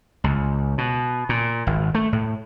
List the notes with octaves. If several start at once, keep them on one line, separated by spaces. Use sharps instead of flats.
C#2
B2
A#2
G#1
A3
A2